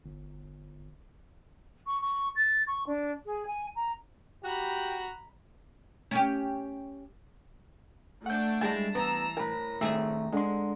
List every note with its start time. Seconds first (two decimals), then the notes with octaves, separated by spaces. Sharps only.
0.05 G1
1.87 C#6
2.02 C#6
2.36 A6
2.67 C#6
2.87 D4
3.26 G#4
3.47 G#5
3.75 A#5
4.44 F#4 G4 A#5 B5
6.11 C#4 G4
8.26 A3 D4 F#5 G6
8.61 G3 G#3 E4 A5
8.95 E3 B3 A#5 E6
9.37 A2 A#4 A#5 B5
9.81 D#3 A3 C4 G#4 E5
10.32 D3 G#3 C6